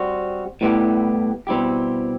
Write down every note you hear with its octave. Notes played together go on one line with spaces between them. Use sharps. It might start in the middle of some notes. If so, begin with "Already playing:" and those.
Already playing: G3 C4 F#4
A2 G3 B3 E4 G4
B2 G3 C4 E4 G4